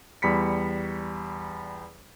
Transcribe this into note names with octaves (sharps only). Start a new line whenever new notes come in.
E2 G3 B5 B6 C#7